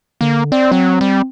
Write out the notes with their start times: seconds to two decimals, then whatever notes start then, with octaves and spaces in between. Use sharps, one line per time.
0.21 D3 A#3
0.52 C4 D5
0.72 F#3 C4
1.01 G3